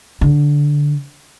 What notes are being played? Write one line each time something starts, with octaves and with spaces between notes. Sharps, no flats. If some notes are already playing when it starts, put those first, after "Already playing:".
D3